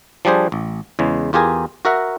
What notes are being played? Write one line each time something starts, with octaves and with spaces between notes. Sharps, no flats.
F3 G3 D4 G#4 C5
A1
E2 C#3 G#3
E2 F4 G4 G#4 A#4 G#5
F#4 A#4 E5 F#5